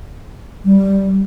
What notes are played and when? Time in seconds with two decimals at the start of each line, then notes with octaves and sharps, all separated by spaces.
0.65 G3